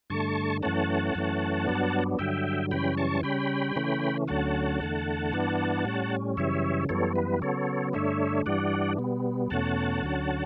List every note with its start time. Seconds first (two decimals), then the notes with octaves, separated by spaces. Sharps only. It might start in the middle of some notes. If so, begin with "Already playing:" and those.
0.10 G2 D3 A3 A5 C#6
0.62 F#2 E3 A3 C#4 F#5 A5
1.15 F#2 E3 A3 C#4
1.67 G2 F#3 B3 D4
2.19 G2 D3 F#3 E5 G5
2.71 F#2 C#3 E3 G3 C#4 G5 B5
2.97 A5 C#6
3.23 C#3 G3 C#4 G5 B5
3.76 C#3 E3 A3 C#4
4.28 D2 D3 F#3 A3 C#4 F#5 A5
4.80 E2 D3 A3
5.33 G2 E3 B3 D4
5.85 A2 G3 C#4
6.37 F#2 C#3 E3 G3 C#5 E5
6.89 F#2 E3 G3 B3 A4 C#5
7.16 B4
7.41 C#3 F#3 B3 A4 C#5
7.93 G2 D3 A3 D4 C#5 E5
8.46 G2 E3 G3 D4 D5 F#5
8.98 B2 G3 B3
9.50 E2 B2 A3 C#4 F#5 A5
10.03 D2 D3 F#3 C#4